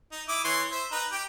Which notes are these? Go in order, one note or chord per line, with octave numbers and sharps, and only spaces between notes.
D#4
E4 D6 D#6
E3 C#5 C6
C5 E5
D#4 B4 A#5
G4 G5